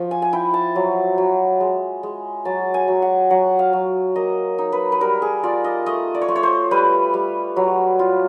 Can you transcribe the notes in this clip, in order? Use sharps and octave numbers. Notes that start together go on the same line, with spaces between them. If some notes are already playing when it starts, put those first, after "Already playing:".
Already playing: F3
G#5
G#5
E4 G5
A5
F#3
F#3
G#3
G#3
F#3 A5
G#5
F#3
F#5
F#3 F#5
F5
F#3
A#3 D#5
D#4
B4
B4
G3 A#4
G#4
F4 D5
D#5
A3 D#5
D5
C#5
A3 C5
C#5
C5
G3 B4
G3
F#3
F4